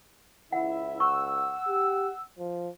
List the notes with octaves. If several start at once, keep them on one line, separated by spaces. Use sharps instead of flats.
C#2 E4 E5 F#5
F#5 C#6 E6
G4
F3